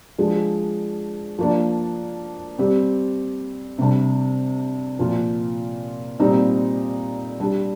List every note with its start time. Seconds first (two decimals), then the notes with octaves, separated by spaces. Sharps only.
0.18 F3 G#3 D4
1.39 F3 A#3 D4
2.59 G3 C4 G4
3.78 C3 G3 D4
4.99 A#2 F3 A#3 F4
6.20 A#2 G3 C4 D#4 G4
7.40 G3 D4 G4